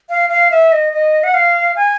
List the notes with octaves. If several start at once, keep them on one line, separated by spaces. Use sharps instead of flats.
F5
F5
E5
D#5
D#5
F#5
F5
G#5